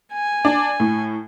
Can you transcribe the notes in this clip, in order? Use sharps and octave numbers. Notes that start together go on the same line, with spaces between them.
G#5
D4
A2